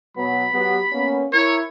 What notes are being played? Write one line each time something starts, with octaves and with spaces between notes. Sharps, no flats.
B2 F#3 B3 B5
F#3 B3 G4
A#3 B3 C#4
E4 A#4 C#5